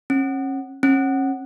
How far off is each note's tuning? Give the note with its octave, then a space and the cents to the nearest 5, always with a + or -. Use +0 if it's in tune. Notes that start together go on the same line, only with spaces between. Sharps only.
C#4 -35
C#4 -35